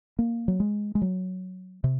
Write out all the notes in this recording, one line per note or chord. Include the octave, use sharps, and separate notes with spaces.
A#3
F#3
G#3
G#3
F#3
C3